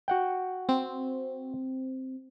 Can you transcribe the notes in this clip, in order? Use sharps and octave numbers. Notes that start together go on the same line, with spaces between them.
F#4 F#5 G5
C4